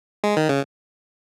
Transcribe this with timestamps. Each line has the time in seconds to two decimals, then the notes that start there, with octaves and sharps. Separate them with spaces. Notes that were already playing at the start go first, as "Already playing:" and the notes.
0.24 G#3
0.37 D#3
0.49 C#3